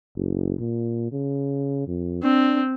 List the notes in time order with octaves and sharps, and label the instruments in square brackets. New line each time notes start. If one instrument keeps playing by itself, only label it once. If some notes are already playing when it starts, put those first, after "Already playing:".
[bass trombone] F#1
A#2
C#3
F2
[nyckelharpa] C4 [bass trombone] D4